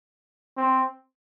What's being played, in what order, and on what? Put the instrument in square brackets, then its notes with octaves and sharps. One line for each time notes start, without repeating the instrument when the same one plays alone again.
[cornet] C4